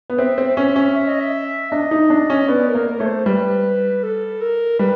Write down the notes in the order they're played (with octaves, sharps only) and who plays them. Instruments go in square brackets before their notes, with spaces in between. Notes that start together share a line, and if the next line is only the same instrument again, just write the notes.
[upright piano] B3
[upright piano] C4 [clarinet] E5
[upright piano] C4
C#4
C#4
[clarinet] E5
D#5
E5
[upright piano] D4 [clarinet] D#5
[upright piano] D#4
D4
C#4
[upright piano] B3 [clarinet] D5
[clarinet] A#4
[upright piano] A#3
[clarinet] A#4
[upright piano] A3 [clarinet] C#5
[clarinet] C5
[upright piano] G3 [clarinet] B4
[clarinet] A4
A#4
[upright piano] G3 [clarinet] B4